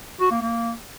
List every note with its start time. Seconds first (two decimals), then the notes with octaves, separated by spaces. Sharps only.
0.20 F#4
0.31 A#3
0.42 A#3